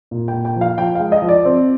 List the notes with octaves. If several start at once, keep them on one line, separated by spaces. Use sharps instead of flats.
A#2
G5
A#2
G5
F3
F5
F3 G5
G#3 F5
D#5
F3
D5
C4